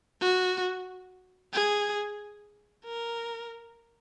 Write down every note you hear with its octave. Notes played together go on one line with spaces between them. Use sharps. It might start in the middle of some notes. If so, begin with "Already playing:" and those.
F#4
G#4
A#4